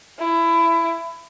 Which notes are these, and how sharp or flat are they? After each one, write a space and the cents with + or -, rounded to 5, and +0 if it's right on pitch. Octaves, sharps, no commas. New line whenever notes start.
E4 +20